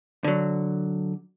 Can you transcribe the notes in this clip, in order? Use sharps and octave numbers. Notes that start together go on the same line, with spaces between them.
D3 F#3